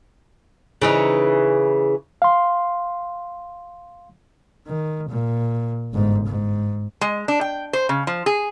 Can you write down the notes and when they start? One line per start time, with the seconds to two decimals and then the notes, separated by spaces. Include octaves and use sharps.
0.82 C#3 E3 D#4
2.22 F5 C6
4.67 D#3
5.09 A#2
5.93 G1 G#2
6.26 G#2
7.01 G#3
7.28 D4
7.41 G5
7.73 C5
7.89 C#3
8.07 F3
8.26 G#4